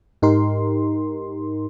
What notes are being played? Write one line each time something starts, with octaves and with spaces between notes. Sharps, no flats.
G#2 D#4 G4 A#4 C6